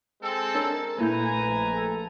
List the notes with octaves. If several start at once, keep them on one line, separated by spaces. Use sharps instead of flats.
G#3 C4 A4
D4 A#4 C#5
A#2 A3 A#3 E4 B4 G#5 A#5 G6
A#1
A4